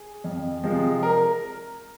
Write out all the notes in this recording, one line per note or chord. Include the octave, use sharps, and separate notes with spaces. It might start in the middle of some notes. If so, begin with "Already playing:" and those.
Already playing: G#4
F2
C3 F3 G#3
A#4